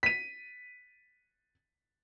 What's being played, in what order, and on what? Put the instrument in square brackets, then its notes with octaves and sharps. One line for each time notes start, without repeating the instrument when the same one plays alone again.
[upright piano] B6 D#7